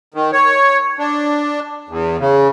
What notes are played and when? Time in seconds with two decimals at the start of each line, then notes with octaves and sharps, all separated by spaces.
0.14 D#3
0.33 C#5
0.99 D4
1.89 E2
2.20 C#3